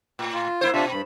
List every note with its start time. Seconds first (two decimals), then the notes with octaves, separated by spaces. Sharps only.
0.19 A2
0.33 F4
0.61 A#3 E4 C5
0.74 B2 D4 F4 E5
0.91 G2 B5